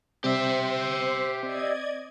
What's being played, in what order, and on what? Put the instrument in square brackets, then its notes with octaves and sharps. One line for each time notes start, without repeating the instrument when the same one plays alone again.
[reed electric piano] C3 G3 C4 [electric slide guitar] G4 E5 [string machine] C5
[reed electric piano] C4 [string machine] D5 D#5 G#6